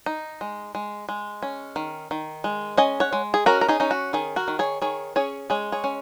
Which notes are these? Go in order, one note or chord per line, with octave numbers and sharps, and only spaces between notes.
D#4
G#3
G#3
G#3
C#4
D#3
D#3
G#3
C#4 D#5 G#5
C#5 F#5
G#3
G#4
C#4 F#4 A#4
A#4
D#4 G#4
C#4 D#4
F#4
D#3 D#4 G#4
F#4 A#4
D#3
G#4 C#5
D#3 G#4 C#5
C#4 G#4 C#5
G#3 G#4 C#5
G#4 C#5
C#4